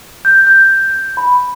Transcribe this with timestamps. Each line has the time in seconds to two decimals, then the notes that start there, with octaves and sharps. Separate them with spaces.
0.25 G6
0.47 G6
1.17 B5